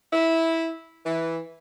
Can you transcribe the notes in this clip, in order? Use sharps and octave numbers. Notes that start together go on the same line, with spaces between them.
E4
E3